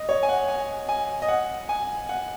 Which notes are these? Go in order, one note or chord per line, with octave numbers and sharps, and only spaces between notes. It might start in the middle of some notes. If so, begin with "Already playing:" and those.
Already playing: D#5
C#5
G#5
F#5
G#5
G#5
D#5
F#5
G#5
F#5